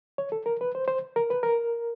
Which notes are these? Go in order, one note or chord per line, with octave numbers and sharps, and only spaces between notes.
C#5
A4
A#4
B4
C5
C5
A#4
B4
A#4